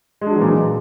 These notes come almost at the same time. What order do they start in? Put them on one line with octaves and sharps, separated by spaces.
G#3 D4 F#3 E3 A#2